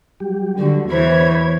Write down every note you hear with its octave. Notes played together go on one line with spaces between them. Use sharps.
F#3 G3 G4
D3 F#4
E2 E3 C5 C#5 B5 G#6